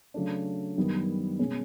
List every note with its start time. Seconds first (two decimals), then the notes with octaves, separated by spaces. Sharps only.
0.14 C#3 F#3 A3 D4
0.77 F#2 D#3 G3 B3
1.39 B2 G#3 C#4